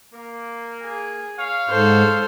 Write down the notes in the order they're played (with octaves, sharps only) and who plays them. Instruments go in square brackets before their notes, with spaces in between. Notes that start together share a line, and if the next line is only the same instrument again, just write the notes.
[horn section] A#3
[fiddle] G#4
[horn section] C#5 F5
[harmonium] G#2 [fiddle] A4 C5